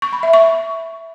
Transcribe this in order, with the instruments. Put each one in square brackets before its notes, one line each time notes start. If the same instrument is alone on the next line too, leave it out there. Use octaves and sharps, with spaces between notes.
[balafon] C#6
B5
E5
C#6